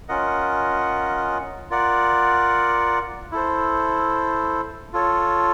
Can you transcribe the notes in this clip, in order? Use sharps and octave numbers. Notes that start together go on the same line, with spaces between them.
C#4 F4 A#4 D#5 F#5
F4 A#4 D5 F#5
E4 A4 C5
F4 A4 C#5